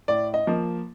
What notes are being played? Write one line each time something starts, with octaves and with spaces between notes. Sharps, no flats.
A2 D5
D#5
F3 A#3